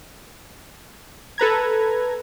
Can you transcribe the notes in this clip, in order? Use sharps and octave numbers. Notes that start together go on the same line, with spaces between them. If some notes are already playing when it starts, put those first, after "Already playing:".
A4 B4 A#5 G#6